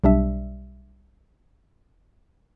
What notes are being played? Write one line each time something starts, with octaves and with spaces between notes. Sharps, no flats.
B1 G3 D4 E5